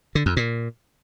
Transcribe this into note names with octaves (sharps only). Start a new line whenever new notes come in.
D3
F2
A#2